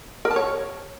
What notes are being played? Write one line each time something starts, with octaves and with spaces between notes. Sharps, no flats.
A#4
A5
C#5